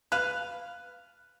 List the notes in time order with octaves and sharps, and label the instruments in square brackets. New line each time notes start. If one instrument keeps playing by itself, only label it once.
[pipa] B4 F5 [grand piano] F#6